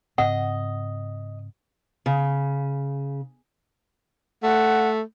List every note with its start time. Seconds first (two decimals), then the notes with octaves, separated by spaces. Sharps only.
0.18 G#2 C#3 C4 D#5 F#5
2.06 C#3
4.43 A3 F#5